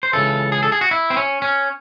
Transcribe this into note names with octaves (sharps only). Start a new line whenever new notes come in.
C5
C#2 C#3 E3 A4
G#4
A4
G#4
F#4
E4
C4
C#4
C#4